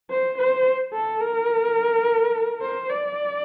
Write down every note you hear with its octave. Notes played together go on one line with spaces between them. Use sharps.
C5
C5
A4
A#4
C5
D5